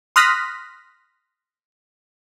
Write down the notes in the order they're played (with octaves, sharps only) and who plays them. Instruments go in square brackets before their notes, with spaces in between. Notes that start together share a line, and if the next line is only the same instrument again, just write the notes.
[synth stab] C6 D#6 F6 F#6 A#6 B6